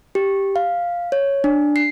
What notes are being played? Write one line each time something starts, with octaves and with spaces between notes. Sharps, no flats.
G4
F5
C#5
D4
C7